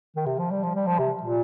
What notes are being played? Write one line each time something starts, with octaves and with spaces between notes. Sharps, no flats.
D#3
C3
F3
G3
F3
G3
F3
C3
A#2